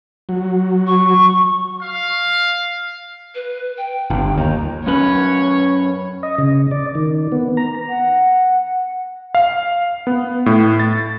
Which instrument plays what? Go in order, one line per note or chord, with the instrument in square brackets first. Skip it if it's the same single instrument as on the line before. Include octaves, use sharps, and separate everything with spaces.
[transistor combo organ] F#3
[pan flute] C#6
[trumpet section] F5
[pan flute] B4
G5
[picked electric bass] G1
[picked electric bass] D#2 [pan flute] A#5
[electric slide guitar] F#2 C#4 B4 [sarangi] C#5
[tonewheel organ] D#5
C#3
D5
D#3
B3
A#5
[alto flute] F#5
[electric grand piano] F5
B3
A2
A6